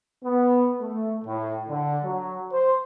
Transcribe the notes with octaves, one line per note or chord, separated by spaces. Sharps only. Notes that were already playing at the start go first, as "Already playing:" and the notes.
B3
A3
A2
D3
F#3
C5